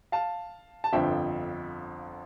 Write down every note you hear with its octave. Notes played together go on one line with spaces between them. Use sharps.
F5 A5
A5
G1 F2 D3 F3 E5 G5